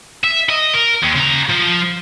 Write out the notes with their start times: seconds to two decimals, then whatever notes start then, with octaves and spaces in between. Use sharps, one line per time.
0.24 E5
0.50 D#5
0.74 A#4
1.03 D#2
1.15 C#3 A#5
1.49 F3